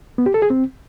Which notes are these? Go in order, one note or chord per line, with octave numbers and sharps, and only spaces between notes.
B3
G4
A4
G#4
C4